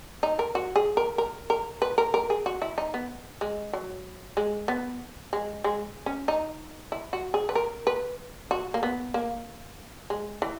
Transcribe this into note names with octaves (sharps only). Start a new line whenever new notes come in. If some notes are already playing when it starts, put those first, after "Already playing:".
D#4
A#4
F#4
G#4
A#4
A#4
A#4
B4
A#4
A#4
G#4
F#4
E4
D#4
B3
G#3
F#3
G#3
B3
G#3
G#3
C#4
D#4
E4
F#4
G#4
B4
A#4
B4
F#4
A#3
B3
A#3
G#3
E3